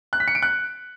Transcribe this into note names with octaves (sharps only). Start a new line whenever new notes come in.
F#6
B6
C#7
D7
F#6